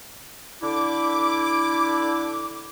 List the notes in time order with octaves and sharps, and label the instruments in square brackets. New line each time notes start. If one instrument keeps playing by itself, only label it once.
[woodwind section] D3 E4 D6